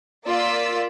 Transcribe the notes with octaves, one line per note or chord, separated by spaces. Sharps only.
A#3 F4 D5 E6 B6